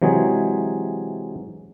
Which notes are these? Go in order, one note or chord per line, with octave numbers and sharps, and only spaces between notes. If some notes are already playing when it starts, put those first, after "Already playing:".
C3 E3 F#3 G#3 G#4